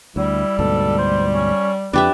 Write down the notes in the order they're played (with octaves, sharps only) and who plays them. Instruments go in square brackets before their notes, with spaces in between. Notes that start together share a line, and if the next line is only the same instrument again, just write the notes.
[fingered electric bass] D2 [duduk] G3 [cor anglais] E4
[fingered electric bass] D2 G#2 B2 [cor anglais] A4
[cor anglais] C5
C#4
[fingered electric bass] F2 [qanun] D4 G4 E5 [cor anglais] B4